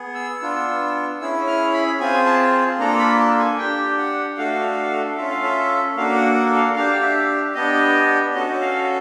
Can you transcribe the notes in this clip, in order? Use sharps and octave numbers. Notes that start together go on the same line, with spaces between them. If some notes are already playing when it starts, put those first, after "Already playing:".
Already playing: B3 G#4
E6
B3 D4 F4
C#4 E4 G#4 E6
F6
B5
C4 F4 G#4 G#5
A5
A#3 D4 F4 A4 A#5
B5
A5
G#5
D4 G4 G5
F#5
A3 D4 F#4 A4 F5
C#4 F4 A4 E5
F5
E5
A#3 D4 F#4 A4 F5
F#5
F#5
F5
D4 G4 F5
E5
B3 D4 G4 D#5
C#4 F#4 A4 D#5
F5